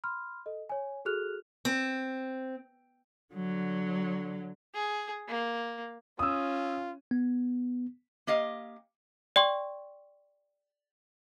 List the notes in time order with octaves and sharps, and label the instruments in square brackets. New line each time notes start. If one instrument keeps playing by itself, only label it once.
[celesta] B5 C6 F6
A4 D#5
C#5 G#5
F#4 G#4 A4 F6 F#6 F7
[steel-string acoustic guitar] C4
[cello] D3 F#3
[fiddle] G#4
A#3
[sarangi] C#4 [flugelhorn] F4 [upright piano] D#6 E6
[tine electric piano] B3
[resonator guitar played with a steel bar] A#3 G4 D#5 F5
[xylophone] D5 G5 C6 C#6